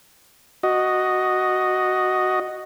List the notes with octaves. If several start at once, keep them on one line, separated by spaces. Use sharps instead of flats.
F#4 D#5